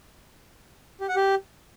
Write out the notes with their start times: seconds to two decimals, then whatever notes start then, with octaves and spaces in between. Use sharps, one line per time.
1.01 G4
1.08 F#5
1.16 G4